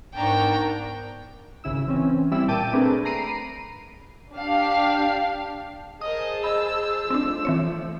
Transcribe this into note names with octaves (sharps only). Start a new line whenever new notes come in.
G#2 B3 D4 A#4 G5 A5 A#5 C#6
G#1 C#3 E4 E6
E3 C4 C#4
G3 C4 E4 E5 E6
A#2 G5 A5 D6 D#7
A3 C4 D4 G#4 A#4 B4
A#5 B5 C7 D7 D#7
D4 G4 F5
G#4 A#4 C5 D#5 A5 D#6
D#5 B5 E6
F3 A3 C4 D4
E3 C4 C#5